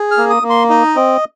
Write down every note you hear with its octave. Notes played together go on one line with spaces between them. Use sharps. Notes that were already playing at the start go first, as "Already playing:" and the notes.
Already playing: G#4
F6
A#3
D#6
A#3
C6
D#4 D#5
C4